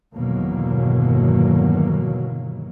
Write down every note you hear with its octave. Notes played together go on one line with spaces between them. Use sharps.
G1 E2 B2 D#3 F#3 A#3